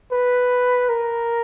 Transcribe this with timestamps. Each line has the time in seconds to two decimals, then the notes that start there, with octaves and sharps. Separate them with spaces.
0.12 B4
0.89 A#4